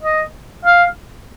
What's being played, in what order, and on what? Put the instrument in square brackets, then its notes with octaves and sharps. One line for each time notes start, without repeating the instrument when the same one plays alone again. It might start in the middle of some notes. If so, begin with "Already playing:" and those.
[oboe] D#5
F5